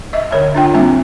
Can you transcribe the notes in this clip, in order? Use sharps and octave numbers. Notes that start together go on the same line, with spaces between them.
D#5 E5
D3 C#5 E5
D4 F4 G5
G3 A#3 C4 D4 E5